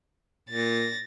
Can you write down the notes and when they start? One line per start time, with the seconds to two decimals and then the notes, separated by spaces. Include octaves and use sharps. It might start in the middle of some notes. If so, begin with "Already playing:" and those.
0.49 A#2 A6 A#6